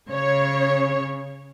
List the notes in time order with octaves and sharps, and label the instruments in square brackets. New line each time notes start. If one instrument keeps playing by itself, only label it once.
[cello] C#3 [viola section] C#5